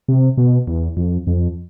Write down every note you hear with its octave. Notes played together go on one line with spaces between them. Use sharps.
C3
B2
E2
F2
F2